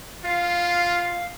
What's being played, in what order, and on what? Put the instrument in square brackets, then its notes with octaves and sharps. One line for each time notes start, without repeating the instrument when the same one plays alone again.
[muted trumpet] F4 [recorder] F5